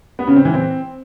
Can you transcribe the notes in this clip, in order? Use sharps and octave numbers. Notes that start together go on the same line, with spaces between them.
B3
C#3
C4
E3
C4